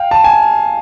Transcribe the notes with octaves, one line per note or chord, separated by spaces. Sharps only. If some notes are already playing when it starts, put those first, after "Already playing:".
Already playing: F5 G5
A5
G#5